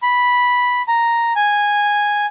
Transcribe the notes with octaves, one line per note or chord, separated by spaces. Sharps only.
B5
A#5
G#5